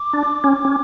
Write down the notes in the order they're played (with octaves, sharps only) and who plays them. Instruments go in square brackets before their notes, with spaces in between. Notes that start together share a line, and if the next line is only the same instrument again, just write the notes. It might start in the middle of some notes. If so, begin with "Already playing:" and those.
Already playing: [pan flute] D6
[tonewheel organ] D4
C#4
C#4